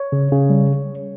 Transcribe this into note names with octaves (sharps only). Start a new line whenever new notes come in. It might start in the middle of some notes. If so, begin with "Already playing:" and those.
Already playing: C#5
C#3
C#3
G3